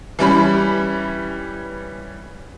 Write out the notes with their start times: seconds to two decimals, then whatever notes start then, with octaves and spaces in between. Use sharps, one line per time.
0.19 E3 G3 C#4 B5